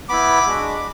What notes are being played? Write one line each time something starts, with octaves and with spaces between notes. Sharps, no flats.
B3 E4 B5 D6
G#3 D4 F#4